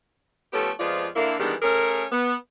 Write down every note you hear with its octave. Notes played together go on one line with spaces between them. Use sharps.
F3 A3 B3 C#4 G4 A4
F2 F3 G#3 B3 F4 D5
D3 A#3 E4
D#3 E3 G3 G#3 B3 D4
A3 C#4 G#4 A#4
B3